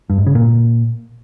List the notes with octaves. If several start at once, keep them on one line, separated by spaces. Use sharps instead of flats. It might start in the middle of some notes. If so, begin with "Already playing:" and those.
G2
G#2
C#3
A#2